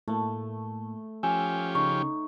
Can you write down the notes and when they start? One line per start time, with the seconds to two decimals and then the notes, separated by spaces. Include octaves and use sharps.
0.08 A2 A3 A#3
1.23 F3 C#4 G4 G#5 E6
1.75 C#3 D#4 C#6